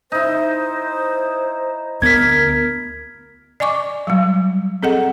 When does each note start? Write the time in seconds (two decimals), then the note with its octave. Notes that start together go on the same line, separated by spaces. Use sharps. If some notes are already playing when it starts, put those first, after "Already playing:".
0.12 D#4 E4 C5
2.02 D2 B3 A#4 G#6 B6
3.60 D5 D#5 G#5 C#6 D6
4.07 F#3 G3
4.83 C4 G#4 A4 D#5 F#5